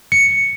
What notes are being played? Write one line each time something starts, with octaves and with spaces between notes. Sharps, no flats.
C#7